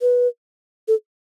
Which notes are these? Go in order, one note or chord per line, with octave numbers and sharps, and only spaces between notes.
B4
A4